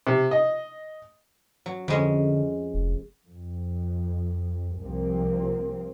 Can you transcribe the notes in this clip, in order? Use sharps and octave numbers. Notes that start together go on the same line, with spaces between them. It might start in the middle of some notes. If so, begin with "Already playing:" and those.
C3
D#5
F#3
F2 D3 G#3 C#4
F1
F2
C2 F3 A#3 C4